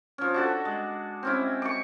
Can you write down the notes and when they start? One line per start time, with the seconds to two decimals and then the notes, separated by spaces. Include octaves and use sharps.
0.18 F3 C#4
0.34 D4 F#4 A4
0.65 G#3
1.23 C4 C#4 E4
1.62 C#6 D6